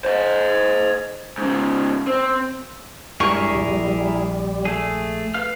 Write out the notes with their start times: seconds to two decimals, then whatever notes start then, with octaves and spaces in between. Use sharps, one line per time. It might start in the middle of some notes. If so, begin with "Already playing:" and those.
0.05 C5 D#5
1.38 G#2 C#3
2.07 C4
3.20 F#2 G3 G#3 D4 E4 G#4 A#4 C#6
3.55 A#1
4.65 A3 G#4
5.34 B4 F5 F6